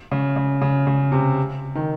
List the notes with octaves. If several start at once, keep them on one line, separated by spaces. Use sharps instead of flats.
C#3
C#3
C#3
C#3
C3
D#3